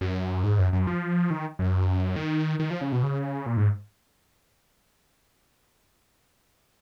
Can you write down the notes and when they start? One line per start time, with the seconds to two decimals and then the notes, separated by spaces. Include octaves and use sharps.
0.01 F#2
0.44 G#2
0.59 F#2
0.73 F#2
0.87 F3
1.30 D#3
1.59 F#2
2.16 D#3
2.59 D#3
2.71 F3
2.81 C#3
2.92 B2
3.03 C#3
3.46 A#2
3.57 G#2